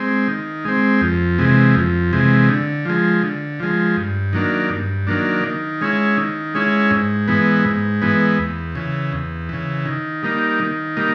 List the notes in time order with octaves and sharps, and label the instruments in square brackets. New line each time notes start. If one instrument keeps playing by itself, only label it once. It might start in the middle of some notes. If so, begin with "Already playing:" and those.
Already playing: [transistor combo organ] G#3 C4
D#3
G#3 C4
F2
C3 E3 G#3
F2
C3 E3 G#3
D3
F3 G#3
D3
F3 G#3
G2
D#3 F#3 A#3 D4
G2
D#3 F#3 A#3 D4
D#3
G#3 C#4 E4
D#3
G#3 C#4 E4
G#2
E3 G#3 B3
G#2
E3 G#3 B3
E2
C#3 E3
E2
C#3 E3
D#3
G3 A#3 D#4
D#3
G3 A#3 D#4